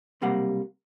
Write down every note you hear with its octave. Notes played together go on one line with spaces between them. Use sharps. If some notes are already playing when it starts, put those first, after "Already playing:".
B1 C3 G3 A#3 F#5